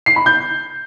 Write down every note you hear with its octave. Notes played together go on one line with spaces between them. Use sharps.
C7
B5
G6